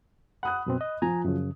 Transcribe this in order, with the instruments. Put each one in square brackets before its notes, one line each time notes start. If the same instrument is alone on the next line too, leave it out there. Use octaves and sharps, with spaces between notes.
[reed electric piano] F#5 [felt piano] B5 D#6 F#6
[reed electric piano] F#2 B2 C4
D#5
[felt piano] F3 [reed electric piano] G#5 A#5
[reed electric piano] F#2 C#3